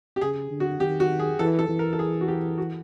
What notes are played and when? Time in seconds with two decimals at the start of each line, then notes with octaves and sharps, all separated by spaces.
0.16 G4
0.21 C#3 G#4
0.51 D3
0.60 F#4
0.80 D#3 G4
1.00 F#4
1.19 G#4
1.39 E3 A4
1.59 A4
1.69 E3
1.79 A#4
1.93 A4
1.99 G#4
2.21 F#4
2.28 G4
2.58 F#4